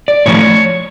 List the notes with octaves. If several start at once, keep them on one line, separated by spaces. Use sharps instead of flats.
D5
A2 F3 A3 C#5